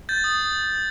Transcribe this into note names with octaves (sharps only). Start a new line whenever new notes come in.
G6 A6
D#6